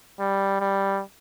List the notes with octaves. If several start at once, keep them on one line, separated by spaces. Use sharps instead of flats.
G3
G3